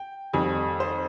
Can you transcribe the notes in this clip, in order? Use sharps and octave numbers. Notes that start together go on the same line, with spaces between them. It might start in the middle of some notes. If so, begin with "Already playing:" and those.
Already playing: G5
F2 D#3 G3 G#5
C5